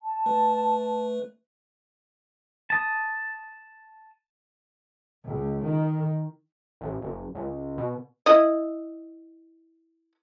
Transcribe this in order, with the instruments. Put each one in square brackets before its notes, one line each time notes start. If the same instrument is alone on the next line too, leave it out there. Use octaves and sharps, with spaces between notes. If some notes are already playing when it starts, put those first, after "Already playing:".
[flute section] A5
[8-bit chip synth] A3 B4
[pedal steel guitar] A5 D#6
[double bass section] C#2
D#3
[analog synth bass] A1
F#1
C#2
B2
[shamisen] E4 D#5